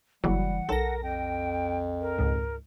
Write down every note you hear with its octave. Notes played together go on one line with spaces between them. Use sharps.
F#1 E3 F#3 G3 F#5
B1 A4 A#4 A#6
F2 G5
A#4
C#2 G#2